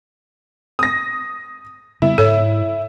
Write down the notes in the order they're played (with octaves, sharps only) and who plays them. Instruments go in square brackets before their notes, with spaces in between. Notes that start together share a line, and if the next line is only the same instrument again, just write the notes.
[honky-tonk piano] D#6 A#6
[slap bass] C#3 G3 B3 [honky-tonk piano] E4
[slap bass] G#2 [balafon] A4 C#5